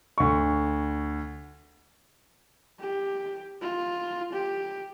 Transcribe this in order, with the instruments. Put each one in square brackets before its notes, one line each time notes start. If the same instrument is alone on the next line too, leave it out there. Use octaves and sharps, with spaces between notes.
[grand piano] D2 C#6
[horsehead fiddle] G4
F4
G4